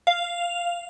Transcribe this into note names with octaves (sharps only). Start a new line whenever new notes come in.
F5